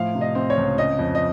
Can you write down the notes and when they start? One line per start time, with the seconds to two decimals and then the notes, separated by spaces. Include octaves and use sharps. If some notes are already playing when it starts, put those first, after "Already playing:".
Already playing: A2 F3 F5
0.15 C3
0.21 D#5
0.35 C4
0.50 C#5
0.57 C#2
0.78 C#3 D#5
0.99 F2
1.15 D#5